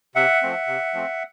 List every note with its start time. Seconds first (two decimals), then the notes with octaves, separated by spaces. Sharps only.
0.16 C3 E5 F#5
0.42 F3 A3 C4
0.67 C3
0.94 F3 A3 C4